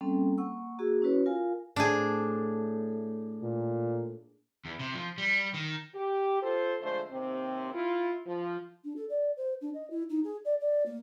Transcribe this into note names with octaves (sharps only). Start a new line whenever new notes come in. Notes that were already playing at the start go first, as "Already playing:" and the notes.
G3 A#3 C4 C#4 A4
A#3 F#5 C#6 E6
A#3 F#4 G#4
C#4 E4 F#4 B4 C#5
F4 A#4 F5 G#5
A2 A3 C4 D4 G#4
A#2
E2
C3
F3
G3
D#3
G4
F4 A4 C5
D3 F3 G#3 A3 C5
D#2 C3 C4
E4 F4
F3
D4
A4
D5
C5
D4
D#5
E4
D#4
G#4
D5
D5
A#3